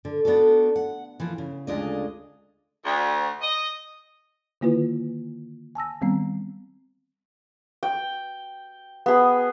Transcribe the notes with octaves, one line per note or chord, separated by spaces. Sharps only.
D3
B3 D4 D#4 F#4 A4
F#5
E3 F3 A#3
C#3
D2 C#3 G#3 D4 F4 D#5
D2
D#5
D3 D#3 A#3 E4 F4 B4
G#5 A5 E6 A#6
D#3 G3 B3 C4
G5
B3 G#4